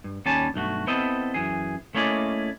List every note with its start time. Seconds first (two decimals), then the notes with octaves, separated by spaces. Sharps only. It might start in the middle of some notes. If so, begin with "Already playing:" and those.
0.04 G2
0.26 D#2 G3 C#4 G#5 A5
0.54 B1 G2 A3 F#4
0.87 B3 C4 E4 A4 D#5
1.34 F#2 E3 G#4
1.95 A3 A#3 C#4 E4 D5 D#5